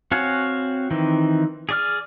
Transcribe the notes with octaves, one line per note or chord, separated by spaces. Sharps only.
C4 F#4 C#5 F5 G#5
D#3 E3 C4
G#4 D5 F6